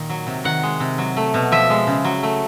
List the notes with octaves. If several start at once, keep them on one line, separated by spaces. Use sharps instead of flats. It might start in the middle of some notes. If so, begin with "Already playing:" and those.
Already playing: A#2 D#3
F#3
C3
D#3 F#5
G#3
C3
F#3
A3
B2
F3 E5
G#3
C#3
F#3
A3